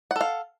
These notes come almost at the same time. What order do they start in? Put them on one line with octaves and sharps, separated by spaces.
F#5 A4 F5